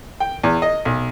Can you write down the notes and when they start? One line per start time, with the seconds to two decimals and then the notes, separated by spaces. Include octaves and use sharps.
0.20 G5
0.43 E2
0.62 D#5
0.85 B1